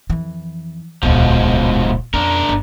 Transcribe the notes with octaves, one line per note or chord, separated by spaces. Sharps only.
F2 E3
D#1 C#2 G#2 B2 F3
F2 C#4 D4 A#4
G1